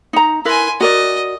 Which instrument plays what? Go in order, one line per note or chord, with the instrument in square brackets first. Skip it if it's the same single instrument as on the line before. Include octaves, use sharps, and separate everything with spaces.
[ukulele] D#4 A#5
[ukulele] E4 A#4 B4 [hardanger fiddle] G#5 C6
[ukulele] F#4 A#4 D5 [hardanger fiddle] D#5